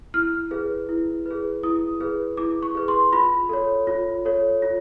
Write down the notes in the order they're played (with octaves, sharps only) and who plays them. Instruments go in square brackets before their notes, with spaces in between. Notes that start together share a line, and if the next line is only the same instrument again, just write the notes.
[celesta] E4 F6
G#4 B4
E4
G#4 B4
E4 D#6
G#4 B4
E4 D6
C#6
G#4 B4
C6
F4 B5
A4 C#5
F4
A4 C#5
F4